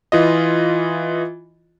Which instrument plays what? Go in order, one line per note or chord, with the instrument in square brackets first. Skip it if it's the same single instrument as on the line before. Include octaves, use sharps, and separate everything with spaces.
[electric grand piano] E3 F4 D#5